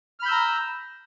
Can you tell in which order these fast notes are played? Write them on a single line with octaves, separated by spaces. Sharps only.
F6 B5 G6 E6 A#5